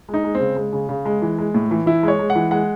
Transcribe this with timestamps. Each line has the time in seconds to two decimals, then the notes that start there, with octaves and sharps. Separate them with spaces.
0.09 G#3
0.14 D#4
0.24 G#3
0.35 C4
0.40 C#3
0.56 G#3
0.73 C#3
0.89 C#3
1.05 G#3
1.22 E3
1.39 G#3
1.54 A2
1.71 E3
1.86 E3 E4
2.03 G#3 C#5
2.19 G#3
2.30 F#5
2.35 E3
2.51 G#3 F#5